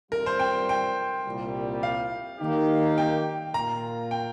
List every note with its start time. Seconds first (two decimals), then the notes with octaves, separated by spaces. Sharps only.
0.11 G2 G3 C4 F4 A#4
0.26 C5
0.39 G5
0.69 G5
1.26 C2 A#2 G3
1.83 F5
2.40 D#3 A#3 D#4 G4
2.98 G5
3.54 A#2 A#3 F4 A#5
4.11 G5